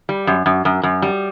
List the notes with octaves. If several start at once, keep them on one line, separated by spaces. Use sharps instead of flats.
G3
F#2
F#2
F#2
F#2
G3